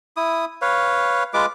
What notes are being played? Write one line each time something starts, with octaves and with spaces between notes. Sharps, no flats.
E4 D#6
B4 C#5 F5
G#3 F4 B4 D6